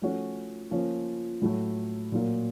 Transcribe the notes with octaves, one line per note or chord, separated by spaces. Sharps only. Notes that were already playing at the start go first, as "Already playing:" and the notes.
F3 A3 C#4 F#4
F3 A#3 C#4
A2 F#3 A3
A#2 F#3 A#3